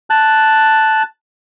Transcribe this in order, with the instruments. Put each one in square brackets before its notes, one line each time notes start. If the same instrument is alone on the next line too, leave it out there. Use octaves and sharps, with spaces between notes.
[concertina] A5 F#6